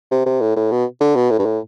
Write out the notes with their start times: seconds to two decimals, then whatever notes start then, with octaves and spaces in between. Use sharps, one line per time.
0.11 C3
0.26 C3
0.41 A2
0.56 A2
0.71 B2
1.01 D3
1.16 B2
1.30 A2
1.39 G2
1.45 A2